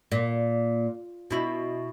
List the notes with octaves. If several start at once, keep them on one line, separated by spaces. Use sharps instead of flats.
A#2
B2 E4